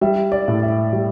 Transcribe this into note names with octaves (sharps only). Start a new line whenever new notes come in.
G3 E5
D5
A2
E5
G3